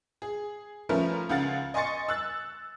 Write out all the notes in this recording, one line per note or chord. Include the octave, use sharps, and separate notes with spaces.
G#4
F3 A3 C#4 A#4 B4
C#2 C#3 F5 F#5 A6
D#5 G#5 C6 C#6 A6 C#7
E6 F#6 A6